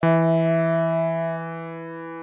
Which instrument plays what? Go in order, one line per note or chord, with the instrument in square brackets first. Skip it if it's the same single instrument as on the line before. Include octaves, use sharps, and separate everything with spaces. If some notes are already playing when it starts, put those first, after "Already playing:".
[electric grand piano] E3 [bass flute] E5